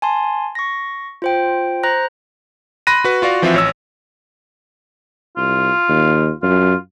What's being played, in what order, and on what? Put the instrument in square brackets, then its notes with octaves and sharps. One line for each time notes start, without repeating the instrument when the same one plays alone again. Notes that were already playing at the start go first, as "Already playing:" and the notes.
[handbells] G#5 A5 C6
C#6 A#6
F4 C5 G5
C5 A#5 F#6 A#6
[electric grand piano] B5 C6 F#6 A#6 D#7
F#4 B4
F4 F#4 D5 F5
E3 F3 C4 F4 F#4 E5
A1 C#5 E6
[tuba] C2 [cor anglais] F4
[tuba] D#2
[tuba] F#2 [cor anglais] F4